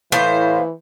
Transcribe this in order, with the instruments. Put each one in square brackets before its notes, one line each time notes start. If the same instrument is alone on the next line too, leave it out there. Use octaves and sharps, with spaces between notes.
[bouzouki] A2 C5 [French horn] E3 [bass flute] F5